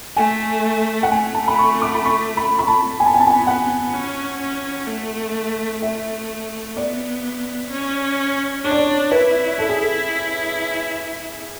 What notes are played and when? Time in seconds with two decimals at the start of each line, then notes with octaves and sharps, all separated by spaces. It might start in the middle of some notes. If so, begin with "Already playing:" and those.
0.16 A3 G#5
1.03 F#5
1.11 A3 G#5
1.34 A5
1.48 B5
1.59 C#6
1.82 D6
1.95 B5
2.05 C#6
2.37 B5
2.59 B5
2.68 A5
2.99 B3 G#5
3.06 A5
3.14 G#5
3.20 A5
3.27 G#5
3.47 F#5
3.93 C#4
4.41 C#4
4.87 A3
5.82 A3 E5
6.76 B3 D5
7.70 C#4
8.64 D4 C#5
8.71 D5
8.78 C#5
9.11 E4 B4
9.59 A4
9.69 G#4
9.81 A4